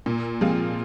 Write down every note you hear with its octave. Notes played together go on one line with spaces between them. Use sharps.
A#2
F3 G#3 C4 F4